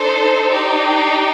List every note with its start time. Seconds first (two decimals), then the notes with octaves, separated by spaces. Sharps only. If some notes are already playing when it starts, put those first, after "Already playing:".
Already playing: D#4 A4 C5
0.49 D#4 G4 D5 G5